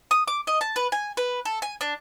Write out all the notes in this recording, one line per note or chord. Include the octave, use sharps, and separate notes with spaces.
D#6
D6
D#5
A5
B4
G#5
B4
A4
G#5
D4